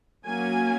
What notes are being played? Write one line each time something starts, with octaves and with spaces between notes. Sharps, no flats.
F#3 A#3 C#4 G#5